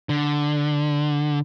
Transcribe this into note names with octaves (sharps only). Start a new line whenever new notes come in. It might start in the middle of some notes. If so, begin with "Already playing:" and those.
D3